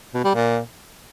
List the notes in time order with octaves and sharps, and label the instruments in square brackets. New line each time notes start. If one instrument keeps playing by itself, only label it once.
[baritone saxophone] B2
G3
A#2